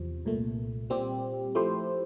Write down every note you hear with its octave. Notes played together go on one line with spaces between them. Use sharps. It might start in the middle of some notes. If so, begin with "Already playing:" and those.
Already playing: E2 C3 F3
C2 A#2 A3
A#2 G3 C4 G4
F3 A3 E4 G4 C5